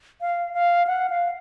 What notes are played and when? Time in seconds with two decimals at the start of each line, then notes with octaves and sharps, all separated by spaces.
0.21 F5
0.53 F5
0.87 F#5
1.10 F5